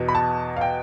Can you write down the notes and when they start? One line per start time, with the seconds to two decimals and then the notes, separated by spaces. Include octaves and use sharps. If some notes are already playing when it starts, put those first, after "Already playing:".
Already playing: E2 B2 B3
0.08 B5
0.15 A5
0.56 F5
0.61 G5